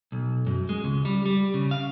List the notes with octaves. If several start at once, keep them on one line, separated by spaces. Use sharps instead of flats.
B1
F#2
G#3
C#2
G3
G3
C#3
F5